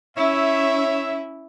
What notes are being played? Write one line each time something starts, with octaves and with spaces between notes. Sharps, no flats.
C#4 E4 C#5 E5